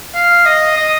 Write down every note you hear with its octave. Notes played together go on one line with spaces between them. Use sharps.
F5
D#5
D#5